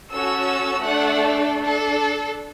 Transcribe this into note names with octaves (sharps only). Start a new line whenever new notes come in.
C#4 F#4 A4 E6
A3 D4 A4 F#5
D4 A4